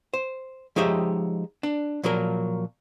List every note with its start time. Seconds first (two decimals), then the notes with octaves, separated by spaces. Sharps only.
0.14 C5
0.76 F3 G#3 D#4 G4 C#5 E5
1.63 D4
2.04 A#2 F3 F#3 A#3 A#4